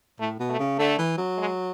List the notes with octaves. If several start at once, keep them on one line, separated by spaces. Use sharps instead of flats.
A2 A3
B2
A3
C#3
D3 A3
E3
F#3
G#3